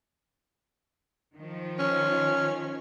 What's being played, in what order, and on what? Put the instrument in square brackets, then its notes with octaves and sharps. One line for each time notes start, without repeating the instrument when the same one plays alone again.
[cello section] D#3 F3
[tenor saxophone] C#4